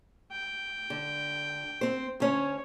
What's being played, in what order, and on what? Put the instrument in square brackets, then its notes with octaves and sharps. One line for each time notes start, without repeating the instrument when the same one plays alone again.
[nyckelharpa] G5
[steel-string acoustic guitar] D3
C4 C5
[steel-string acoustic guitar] D2 C#4 [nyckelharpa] C#5